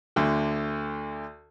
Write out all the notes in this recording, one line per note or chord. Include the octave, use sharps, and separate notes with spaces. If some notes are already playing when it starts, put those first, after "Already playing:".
D2 D3